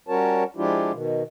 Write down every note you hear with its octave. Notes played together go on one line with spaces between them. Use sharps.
G3 C#4 F#4 A#4 C#5 A5
F3 G#3 D4 E4 F4 G4
B2 D#3